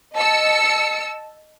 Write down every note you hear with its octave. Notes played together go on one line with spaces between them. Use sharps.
D#5 A5 E6 C#7